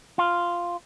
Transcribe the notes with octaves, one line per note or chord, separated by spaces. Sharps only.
F4